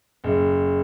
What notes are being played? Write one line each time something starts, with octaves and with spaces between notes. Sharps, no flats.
F#1